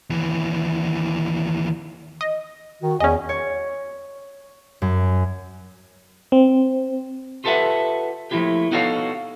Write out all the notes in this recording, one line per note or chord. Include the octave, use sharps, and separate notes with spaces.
D#2 E3
D#5
D#3 F#4
E2 C#4 D#5 G#5
C#5
F#2
C4
F4 G4 A4 B4 E5 F#5
F3 G3 A3 A#3 E4 G4
B3 D#4 F#4 A4 C#5 F5